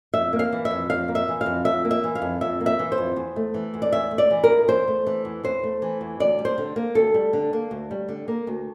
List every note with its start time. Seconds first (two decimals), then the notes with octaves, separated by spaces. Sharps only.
0.14 F2 E5
0.33 A#3
0.39 F5
0.53 E3
0.65 E5
0.71 F2
0.90 F2 F5
1.08 A#3
1.15 E5
1.28 E3
1.41 F5
1.46 F2
1.65 F2 E5
1.85 A#3
1.91 E5
2.04 E3
2.15 F5
2.22 F2
2.41 F2 E5
2.60 A#3
2.66 E5
2.79 E3
2.92 C5
2.98 F2
3.16 E2
3.36 A3
3.54 E3
3.74 E2
3.82 D5
3.92 E2 E5
4.11 A3
4.18 D5
4.31 E3
4.44 A#4
4.50 E2
4.68 E2 C5
4.88 A3
5.07 E3
5.25 E2
5.43 E2 C5
5.63 A3
5.82 E3
6.01 E2
6.20 D2 D5
6.39 G3
6.45 C5
6.58 D3
6.76 A#3
6.95 D2 A4
7.14 G3
7.33 D3
7.53 A#3
7.71 D2
7.91 G3
8.09 D3
8.28 A#3
8.47 D2